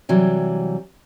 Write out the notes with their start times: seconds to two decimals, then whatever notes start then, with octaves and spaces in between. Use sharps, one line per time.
0.09 C3 E3 F#3 G3